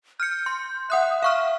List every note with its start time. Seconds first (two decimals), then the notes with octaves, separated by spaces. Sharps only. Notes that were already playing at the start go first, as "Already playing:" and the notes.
0.20 F6 G6 C#7
0.46 C6
0.90 E5 F#5 D#6 F#6
1.23 F5 C#6 F6